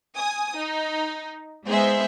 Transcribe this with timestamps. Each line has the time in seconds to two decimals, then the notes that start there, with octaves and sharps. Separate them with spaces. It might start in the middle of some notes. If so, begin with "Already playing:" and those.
0.15 G#5 D#6
0.56 D#4
1.65 G#3 B3 D#4 G#4 C5 E5